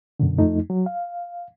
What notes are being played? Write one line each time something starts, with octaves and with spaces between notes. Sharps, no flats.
F#2 B2 D3
F2 F3 A3 D#4
F#3
F5